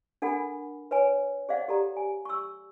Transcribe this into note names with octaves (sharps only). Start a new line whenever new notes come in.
D4 A4 A#4 F#5 G#5 B5
B4 C#5 G#5
G#4 C5 D5 D#5 F5 F#5
G4 A4 D5 A#5
G#5
C#6 E6